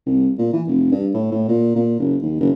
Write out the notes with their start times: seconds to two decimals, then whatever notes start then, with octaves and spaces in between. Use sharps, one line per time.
0.06 C2
0.38 A#2
0.53 E3
0.67 F1
0.92 G2
1.14 A2
1.31 A2
1.48 A#2
1.76 A#2
2.00 F#1
2.22 D#2
2.40 F#1